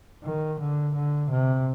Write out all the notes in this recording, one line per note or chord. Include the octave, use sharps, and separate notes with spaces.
D#3
D3
D3
C3